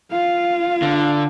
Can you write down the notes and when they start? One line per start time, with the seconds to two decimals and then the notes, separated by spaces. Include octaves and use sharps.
0.12 F4 F5
0.82 D3